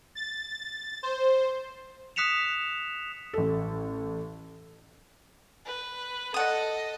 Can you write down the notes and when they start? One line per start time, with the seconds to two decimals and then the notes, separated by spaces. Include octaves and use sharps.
0.15 A6
1.03 C5
2.16 D#6 F#6 B6 C#7 E7 F7
3.33 A1 A4
5.65 B4
6.34 A4 D#5 F#5 D#6